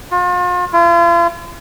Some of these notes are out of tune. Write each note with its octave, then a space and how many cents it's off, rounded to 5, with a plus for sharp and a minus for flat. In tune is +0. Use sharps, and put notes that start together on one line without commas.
F4 +40
F4 -40